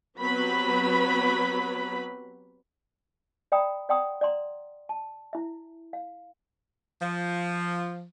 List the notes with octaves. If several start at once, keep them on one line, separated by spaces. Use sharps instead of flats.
F#3 B3 C4 G4 B4 B5
D5 E5 G5 A#5 B5 D#6
D5 F#5 G5 A#5 C6 D#6
D5 F#5 A#5 C6
A5
E4 E5
F5
F3